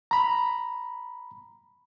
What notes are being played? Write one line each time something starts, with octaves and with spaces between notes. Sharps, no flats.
A#5 B5